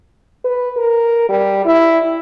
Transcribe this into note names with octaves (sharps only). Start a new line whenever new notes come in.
B4
A#4
G3
E4